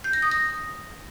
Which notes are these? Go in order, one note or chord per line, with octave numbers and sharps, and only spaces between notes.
G6
A#6
D#6
A#6